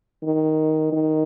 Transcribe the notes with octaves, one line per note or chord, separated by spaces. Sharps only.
D#3
D#3